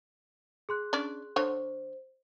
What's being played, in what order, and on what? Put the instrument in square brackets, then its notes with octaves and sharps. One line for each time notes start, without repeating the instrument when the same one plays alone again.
[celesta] G#4 C6 F#6
[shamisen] C#4 D4 D5
[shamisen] D3 C#5 [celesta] C5